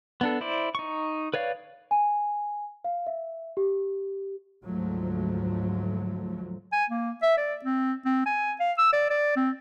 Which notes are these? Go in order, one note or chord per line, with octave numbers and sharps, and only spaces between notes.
B3 D4 A4
E4 C5 D5
D#4 C#6
B4 C#5 D5 F5
G#5
F5
E5
G4
D2 G#2 F3 F#3 A3
G#5
A#3
E5
D5
C4
C4
G#5
F5
E6
D5
D5
C4